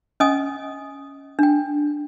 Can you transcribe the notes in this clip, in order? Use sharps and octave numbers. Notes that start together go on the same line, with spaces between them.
C#4 D#5 G#5 D#6
D4 G5